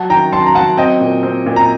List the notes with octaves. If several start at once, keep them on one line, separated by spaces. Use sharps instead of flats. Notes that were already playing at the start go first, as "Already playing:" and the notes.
Already playing: F#3 F#5 A5
D#3 G5 A#5
F#3 A5 C6
A#5
F#3 F#5 A5
C4 D#5 G5
A#2
C4
A#2
A#5